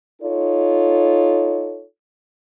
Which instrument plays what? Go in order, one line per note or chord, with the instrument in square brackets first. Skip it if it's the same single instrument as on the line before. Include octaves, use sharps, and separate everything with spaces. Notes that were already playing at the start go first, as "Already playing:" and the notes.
[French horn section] D#4 F4 A4 C#5